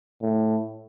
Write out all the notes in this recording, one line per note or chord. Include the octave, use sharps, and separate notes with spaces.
A2